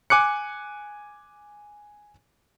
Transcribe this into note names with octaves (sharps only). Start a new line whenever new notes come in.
G#5 D6 F#6 C#7